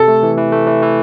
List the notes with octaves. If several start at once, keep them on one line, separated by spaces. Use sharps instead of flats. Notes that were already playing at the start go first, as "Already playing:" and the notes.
Already playing: C3 A4
A3
E3
E3
A3
E3
E3